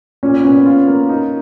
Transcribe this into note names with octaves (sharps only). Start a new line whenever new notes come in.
A#2 C#4
B3 C#4
F4
A#3
D#4